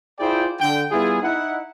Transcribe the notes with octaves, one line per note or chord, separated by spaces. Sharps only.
E4 F4 G#4 C5 D5 G5
D3 G5
G3 B3 E4 F4 G#4
D#4 E4 F#5